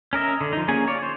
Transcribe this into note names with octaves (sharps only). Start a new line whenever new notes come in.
C#4 A#4 D#5 E5
D3
F3 D#4
A#3 C#4 G#4 G#5
F4 C#5 D5
C5